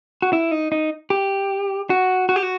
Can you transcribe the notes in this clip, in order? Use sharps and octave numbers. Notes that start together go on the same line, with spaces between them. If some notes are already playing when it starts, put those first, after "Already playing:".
F#4
E4
D#4
D#4
G4
F#4
F#4
G4
F#4